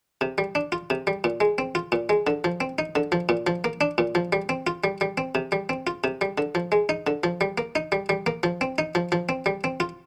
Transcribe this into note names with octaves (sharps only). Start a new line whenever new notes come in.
C3
G3
D4
F4
C3
G3
A#2
G#3
C4
F4
A#2
G#3
D3
F3
C4
D#4
D3
F3
A#2
F3
A#3
D4
A#2
F3
G3
C4
F4
G3
G3
C4
C3
G3
C4
F4
C3
G3
D3
F3
G#3
D#4
D3
F3
G3
A#3
D#4
G3
G3
A#3
F3
C4
D#4
F3
F3
C4
G3
C4
F4